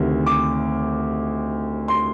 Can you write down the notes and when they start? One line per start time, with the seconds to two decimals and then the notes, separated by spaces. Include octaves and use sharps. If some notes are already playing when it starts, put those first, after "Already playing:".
Already playing: D2 C3 D#3
0.26 D6
1.88 C6